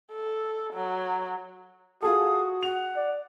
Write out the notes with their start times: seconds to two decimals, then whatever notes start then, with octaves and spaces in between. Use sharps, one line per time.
0.12 A4
0.74 F#3
2.02 F4 F#4 G#4 A4 D#6
2.63 F#5 F7
2.96 D5